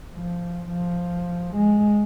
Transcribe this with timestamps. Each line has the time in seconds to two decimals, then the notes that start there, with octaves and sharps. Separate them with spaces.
0.13 F3
0.70 F3
1.56 G#3